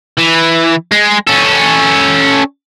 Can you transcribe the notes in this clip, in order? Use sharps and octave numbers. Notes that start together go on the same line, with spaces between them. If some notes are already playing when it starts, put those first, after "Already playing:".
E3
G#3
C#4 A4